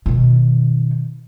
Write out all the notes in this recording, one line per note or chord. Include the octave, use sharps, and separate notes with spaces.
B2 D#3